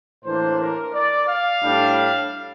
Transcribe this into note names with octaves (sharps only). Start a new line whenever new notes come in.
A2 E3 A#3 D4 C5
A#4
D5
F5
A2 G3 D4